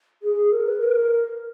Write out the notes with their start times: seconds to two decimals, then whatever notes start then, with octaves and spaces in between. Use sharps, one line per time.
0.23 G#4
0.51 A#4
0.66 B4
0.81 A#4